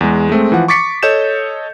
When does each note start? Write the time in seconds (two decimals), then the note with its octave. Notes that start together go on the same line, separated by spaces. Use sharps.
0.01 E2 G#3
0.29 G#3 A3 C4
0.52 E3 F3 F#5
0.68 C#6 D6 A6 B6 C#7
1.03 A4 C#5 D#5 G6 E7